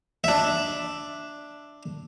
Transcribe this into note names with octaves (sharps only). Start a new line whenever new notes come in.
D4 E5